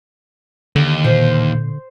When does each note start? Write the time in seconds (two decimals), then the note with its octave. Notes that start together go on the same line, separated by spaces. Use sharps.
0.76 D#2 D3
1.04 A#2 C5